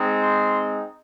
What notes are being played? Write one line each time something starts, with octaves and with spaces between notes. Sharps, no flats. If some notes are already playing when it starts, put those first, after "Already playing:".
Already playing: G#3 C4 D#4
C6